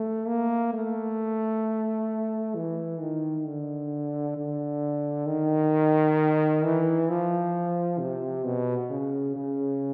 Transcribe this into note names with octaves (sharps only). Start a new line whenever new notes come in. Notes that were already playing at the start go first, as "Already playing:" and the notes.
Already playing: A3
A#3
A3
E3
D#3
D3
D3
D#3
E3
F3
C3
B2
C#3
C#3